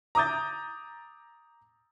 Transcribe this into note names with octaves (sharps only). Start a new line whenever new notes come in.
A#5 D6 D#6 G6 A6